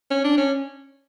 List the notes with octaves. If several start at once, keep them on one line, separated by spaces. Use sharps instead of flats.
C#4
D4
C#4